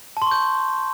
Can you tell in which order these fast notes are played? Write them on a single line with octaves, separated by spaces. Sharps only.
A5 C6 C#6 G6